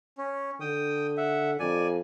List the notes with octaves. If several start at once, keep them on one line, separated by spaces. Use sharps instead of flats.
C#4
D3 G5 D#6
E5 F#5
F2 D5 G#5